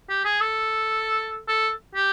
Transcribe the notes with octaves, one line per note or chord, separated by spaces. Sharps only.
G4
G#4
A4
A4
G4